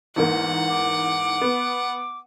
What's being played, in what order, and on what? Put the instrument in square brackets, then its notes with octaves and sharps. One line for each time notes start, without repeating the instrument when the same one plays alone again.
[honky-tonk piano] E2 G#2 A#3 [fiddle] F#5
[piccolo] D6
[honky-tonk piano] B3